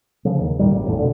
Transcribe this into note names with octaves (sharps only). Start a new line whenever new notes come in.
C#3 F3
D#2 D#3
A2 D#3 G3
A1
A1 F2 A2
B2 D3